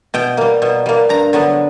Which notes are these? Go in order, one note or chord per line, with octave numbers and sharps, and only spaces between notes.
B2 G5
G3 A#3
B2
G3 A#3
G2 A#5
D3 F#3 B3